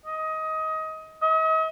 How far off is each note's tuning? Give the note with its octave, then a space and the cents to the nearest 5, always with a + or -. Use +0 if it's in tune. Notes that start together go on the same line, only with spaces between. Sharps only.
D#5 +20
D#5 +45